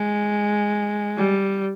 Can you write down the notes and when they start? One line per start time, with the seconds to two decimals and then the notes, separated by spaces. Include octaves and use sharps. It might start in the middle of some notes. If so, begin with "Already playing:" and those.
Already playing: G#3
1.17 G3